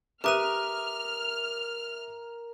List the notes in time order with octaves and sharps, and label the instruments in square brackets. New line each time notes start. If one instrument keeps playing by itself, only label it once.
[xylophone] G4 B4 D#7 [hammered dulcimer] A#4 [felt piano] E5 D6 D#6 [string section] F6